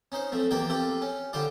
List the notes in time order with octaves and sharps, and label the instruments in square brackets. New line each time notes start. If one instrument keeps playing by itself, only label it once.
[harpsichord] C#4 D#4 C5
F3 A3 C4
E2 F3 A#3 G4 D5 G5
C4 F4 G4 A4
C#4
D3 F3 G3 F4 G4 D5